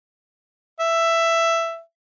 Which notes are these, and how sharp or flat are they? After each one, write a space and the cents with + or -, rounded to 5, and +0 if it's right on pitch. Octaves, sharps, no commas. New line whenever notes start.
E5 +10